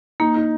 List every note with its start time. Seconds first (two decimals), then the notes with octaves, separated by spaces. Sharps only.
0.20 A#3 D#4
0.36 D#4